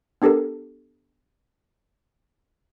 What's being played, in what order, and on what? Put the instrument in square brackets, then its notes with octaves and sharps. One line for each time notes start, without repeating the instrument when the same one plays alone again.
[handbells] B3 D4 G4 A4 A#4